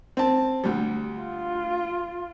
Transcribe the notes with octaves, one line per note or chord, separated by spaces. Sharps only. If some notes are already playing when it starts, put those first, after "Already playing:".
C4 A5
D2 G3
F4